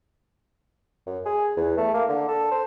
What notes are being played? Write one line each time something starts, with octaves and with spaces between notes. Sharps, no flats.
F#2
G#4
E2
A3
A#3
D3
A4
C5